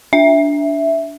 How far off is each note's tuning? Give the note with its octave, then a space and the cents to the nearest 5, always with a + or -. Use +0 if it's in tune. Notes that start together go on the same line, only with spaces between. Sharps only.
D4 -15 E5 +0